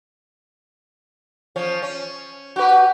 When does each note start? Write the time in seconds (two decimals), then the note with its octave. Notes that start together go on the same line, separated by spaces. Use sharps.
1.56 F3 C#4 C#5
1.82 C#4
2.56 F#4 G4 B4